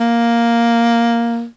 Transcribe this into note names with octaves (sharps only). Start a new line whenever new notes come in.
A#3